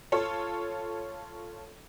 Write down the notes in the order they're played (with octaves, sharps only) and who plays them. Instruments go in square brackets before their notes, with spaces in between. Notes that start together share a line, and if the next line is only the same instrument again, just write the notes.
[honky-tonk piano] F4 A4 C#5